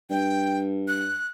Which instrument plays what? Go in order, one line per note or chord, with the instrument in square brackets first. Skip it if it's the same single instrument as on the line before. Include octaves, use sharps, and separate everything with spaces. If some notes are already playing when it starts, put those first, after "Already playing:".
[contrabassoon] G2 [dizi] G5
[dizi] F#6